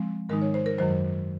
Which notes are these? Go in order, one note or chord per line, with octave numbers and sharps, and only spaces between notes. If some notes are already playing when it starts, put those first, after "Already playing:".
Already playing: F3 G#3 C4
G#2 D#3 G#3 D#4 A#4
C#5
C5
A#4
F#2 D#3 F#3 C5